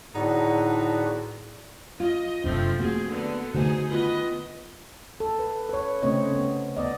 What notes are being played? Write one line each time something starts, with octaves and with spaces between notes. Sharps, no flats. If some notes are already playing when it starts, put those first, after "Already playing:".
A2 D3 B3 D#4 F#4 G#4 D5
F4 D#5
F1 F#2 F3 A3 C4 D4
A3 A#3 C4 F#4 G#4
D3 B3
D3 A3 D#4 F#4 G#4 C5 G#5
D#3 B3 F4 B4 D#5
A4
B4
B4 C#5
C#3 A3 C4 C#5 D#5
B3
B3 D5 D#5